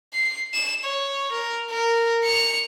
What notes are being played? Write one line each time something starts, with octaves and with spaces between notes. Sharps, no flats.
C7
E7
C#5
A#4
A#4
C#7 F7